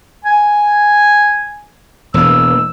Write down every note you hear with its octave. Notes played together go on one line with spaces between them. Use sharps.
G#5
E1 E3 A#3 E6